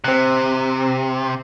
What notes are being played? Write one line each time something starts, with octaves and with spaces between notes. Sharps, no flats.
C3 C4 F#6